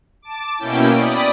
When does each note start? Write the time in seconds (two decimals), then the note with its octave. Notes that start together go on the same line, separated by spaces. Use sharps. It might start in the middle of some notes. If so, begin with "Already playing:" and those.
0.22 A5 D6
0.57 B2 A#3 C#4 E4 G5 D7
0.95 D5 B5 D#6